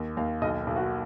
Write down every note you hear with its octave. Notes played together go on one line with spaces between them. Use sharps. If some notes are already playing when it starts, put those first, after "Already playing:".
Already playing: D#2
D#2 F5
B1 D#5
B1
F#4